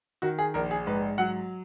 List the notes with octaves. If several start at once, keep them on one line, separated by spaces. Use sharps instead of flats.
D#3 F#4
G#4
A#1 A#4
G#4
G#2 B4
F#3 F#5